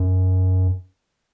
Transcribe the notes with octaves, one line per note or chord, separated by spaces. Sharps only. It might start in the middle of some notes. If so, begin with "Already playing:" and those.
Already playing: F#2